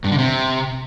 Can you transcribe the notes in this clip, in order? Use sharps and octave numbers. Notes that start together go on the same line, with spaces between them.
G2
D3
C3